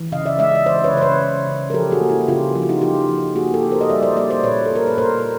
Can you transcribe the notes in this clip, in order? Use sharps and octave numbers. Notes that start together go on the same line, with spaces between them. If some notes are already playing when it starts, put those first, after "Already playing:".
Already playing: E3
C#3 D#5 F5
D5 E5
G#3 D5 E5
D#5
E3 C5 D5
B4 C#5
C#3 C5
B4 C#5
C#3
C#3
A#4
F3 G4 A4
F#4 G#4
A#3
E4 F#4
C#3 F4 G4
F3 F4
F#4
D#4 F4
F3 F4 G4
F3
A#3 F#4 G#4
G4 A4
A#3
A#4 C5
D#5
G3 D5 E5
C5 D5
A#3 C5 D5
C5 D5
A#2 B4 C#5
A4
A#2 A#4
B4
A#2 A#4 C5